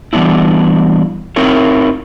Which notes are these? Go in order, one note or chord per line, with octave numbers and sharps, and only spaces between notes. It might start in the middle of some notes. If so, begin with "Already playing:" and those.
E3 G3 B3 D4 E4
C4 D#4 E4 A#4 C#5